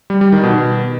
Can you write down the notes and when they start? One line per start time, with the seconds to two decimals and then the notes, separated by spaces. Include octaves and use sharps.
0.10 G3
0.21 G3
0.32 D#3
0.43 B2